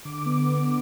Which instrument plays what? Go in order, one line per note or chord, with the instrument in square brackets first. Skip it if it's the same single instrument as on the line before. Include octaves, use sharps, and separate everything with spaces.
[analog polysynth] D3 D6
B3